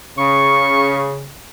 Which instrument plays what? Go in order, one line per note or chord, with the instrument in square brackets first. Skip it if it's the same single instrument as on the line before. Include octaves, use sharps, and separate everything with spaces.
[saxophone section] C#3 [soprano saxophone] C#6